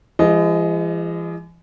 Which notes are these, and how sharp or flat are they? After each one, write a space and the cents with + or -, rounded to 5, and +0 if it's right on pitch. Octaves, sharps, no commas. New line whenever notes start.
E3 +45 G#3 -35 D#5 +0